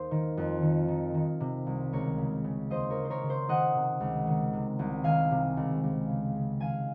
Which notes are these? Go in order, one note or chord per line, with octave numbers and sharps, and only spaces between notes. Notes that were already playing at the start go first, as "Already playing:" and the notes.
Already playing: D#2 C5
D#3
F2
D#3
D#3
D#3
C3
C2
C#2 A#4 C#5
C#3
C#3
D#2 C5 D#5
A#4 C#5
C#3
C5
A#4 C#5
C#3
C5
D#3 D#5 F#5
C3
C#2
D#3
C3
C2
D#3 F5 G#5
C3
C#2
C#2
C#3
C#3
D#3 F5 G#5